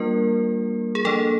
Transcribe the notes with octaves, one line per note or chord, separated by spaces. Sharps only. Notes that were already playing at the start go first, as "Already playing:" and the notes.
Already playing: G3 A#3 D4 F4 A#4
G#4
F3 A#3 D4 A4